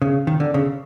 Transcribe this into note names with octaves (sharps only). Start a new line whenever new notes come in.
C#3
D#3
D3
C#3